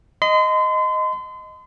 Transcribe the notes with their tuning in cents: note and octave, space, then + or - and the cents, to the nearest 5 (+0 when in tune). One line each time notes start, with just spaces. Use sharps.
D#5 +0 C6 -35